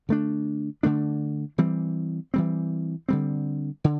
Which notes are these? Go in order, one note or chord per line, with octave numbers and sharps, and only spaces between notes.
D3 A3 D4
D3 A3 D4
E3 G3 C4
E3 G3 C4
D3 G3 C4
D3